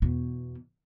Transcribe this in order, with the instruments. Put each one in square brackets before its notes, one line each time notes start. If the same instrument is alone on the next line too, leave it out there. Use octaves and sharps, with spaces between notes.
[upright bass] E2 B2